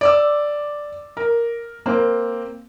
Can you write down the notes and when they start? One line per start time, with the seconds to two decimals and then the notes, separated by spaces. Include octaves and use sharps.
0.01 D5 D6 E6
1.17 A#4
1.86 A#3 C4